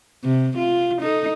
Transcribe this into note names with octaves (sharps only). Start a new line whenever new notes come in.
C3
F4
D#4 A4